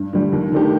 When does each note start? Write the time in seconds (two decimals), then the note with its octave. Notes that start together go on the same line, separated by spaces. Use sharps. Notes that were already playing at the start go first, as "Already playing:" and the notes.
Already playing: G2
0.13 D3 G3
0.33 D#2
0.52 D#3 A3 D4 G4